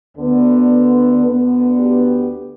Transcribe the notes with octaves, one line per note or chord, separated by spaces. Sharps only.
D2 D3 B3
D2 D3 B3
G4